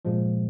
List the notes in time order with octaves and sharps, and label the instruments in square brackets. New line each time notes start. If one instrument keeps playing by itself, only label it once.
[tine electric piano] A#2 F3 G#3